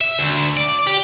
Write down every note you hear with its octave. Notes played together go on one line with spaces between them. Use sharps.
E5
D2
D5
G4